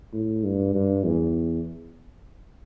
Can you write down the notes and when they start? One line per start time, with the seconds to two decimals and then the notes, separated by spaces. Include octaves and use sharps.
0.13 A2
0.44 G2
0.74 G2
1.05 E2